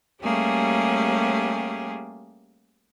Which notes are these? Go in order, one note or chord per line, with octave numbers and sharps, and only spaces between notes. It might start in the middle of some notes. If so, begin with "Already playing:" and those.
G3 A3 A#3 C#4 G4 G#4